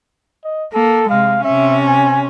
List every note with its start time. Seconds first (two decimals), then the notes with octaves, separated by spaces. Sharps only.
0.44 D#5
0.73 A#3 A4
1.09 C3 G#3 F5
1.44 C3 C#4 E5
1.86 G#5